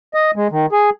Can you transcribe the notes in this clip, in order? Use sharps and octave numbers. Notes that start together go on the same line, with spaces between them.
D#5
G#3
D#3
G#4